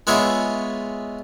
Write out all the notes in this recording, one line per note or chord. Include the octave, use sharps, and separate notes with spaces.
G#3 B3 F4 G#4 C#5 E5